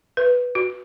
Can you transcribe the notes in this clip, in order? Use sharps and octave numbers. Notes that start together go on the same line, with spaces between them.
B4
F#4